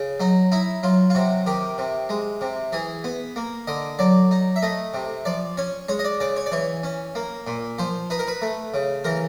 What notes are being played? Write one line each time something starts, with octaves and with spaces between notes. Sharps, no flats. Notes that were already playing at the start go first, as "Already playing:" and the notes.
Already playing: C#3
F#3 D#4
D#4 E4
F#3 F4
F4
C3 F#4
D#3 G4
C3
G#3
C3
E3 G#4
B3
A#3
D3 D#5
F#3 D5
D#4
E5
A3 D#5
C3
F3 D5
C#4 C#5
G#3 C#5
D#5
D5
C#3 D5
C#5
D5
E3 C#5
C#4
A#3
A#2
F3 C5
D#4 B4
A#4
B4
A3
C#3
E3 A#4